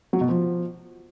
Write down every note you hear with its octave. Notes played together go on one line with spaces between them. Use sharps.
F#3
B2
F3